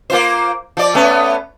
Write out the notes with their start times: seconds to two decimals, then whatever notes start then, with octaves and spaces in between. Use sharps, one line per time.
0.10 A#3 F4 C5
0.77 F3 D5
0.94 A3 B3 C#4